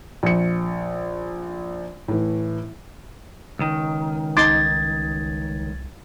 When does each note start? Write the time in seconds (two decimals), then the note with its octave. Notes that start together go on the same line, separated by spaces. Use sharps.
0.23 A#1 C#7
2.08 A2 E3
3.59 C#2 D#3
4.37 C2 D#4 C6 D6 G#6 A6